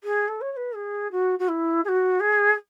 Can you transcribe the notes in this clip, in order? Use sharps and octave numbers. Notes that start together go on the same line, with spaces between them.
G#4
A4
C#5
C#5
B4
G#4
F#4
F#4
E4
G#4
F#4
G#4